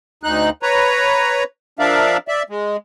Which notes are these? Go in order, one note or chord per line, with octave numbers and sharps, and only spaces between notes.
D2 D#4 F#6
B4 C#5 A#5
F3 D4 A#4 D5 E5 F5
D5 E5
G#3